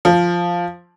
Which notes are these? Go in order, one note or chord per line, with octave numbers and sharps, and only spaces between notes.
F3